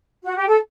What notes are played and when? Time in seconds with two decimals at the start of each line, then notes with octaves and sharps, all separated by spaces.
0.24 F#4
0.36 G4
0.48 A4